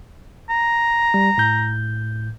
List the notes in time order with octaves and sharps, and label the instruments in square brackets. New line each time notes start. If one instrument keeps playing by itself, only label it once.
[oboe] A#5
[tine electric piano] G3
A2 G6